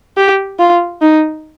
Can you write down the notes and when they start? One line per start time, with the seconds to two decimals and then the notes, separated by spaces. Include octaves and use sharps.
0.17 G4
0.59 F4
1.02 D#4